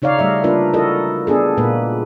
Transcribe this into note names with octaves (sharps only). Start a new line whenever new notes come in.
C#3 D#4 C#5 D5 F5
G3 A3 D#5 E5
A#3 D4 F4 A#4 B4
E4 F#4 A4 A#4 D#5
B3 D4 G#4 A4
A#2 G#3 A#3 B4